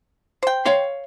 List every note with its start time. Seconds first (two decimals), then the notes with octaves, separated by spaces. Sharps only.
0.43 C5 G5
0.65 C#5 F5 C6